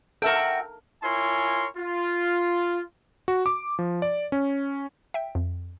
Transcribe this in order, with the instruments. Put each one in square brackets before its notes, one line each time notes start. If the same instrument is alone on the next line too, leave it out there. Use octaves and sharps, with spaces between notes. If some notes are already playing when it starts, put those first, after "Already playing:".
[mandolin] F#4 E5 G5 [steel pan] A4 A#4
[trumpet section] E4 F4 A#4 C#5 G#5 C6
F4
[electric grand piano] F#4
D6
F3
D5
C#4
[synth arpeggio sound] E5 G5
F2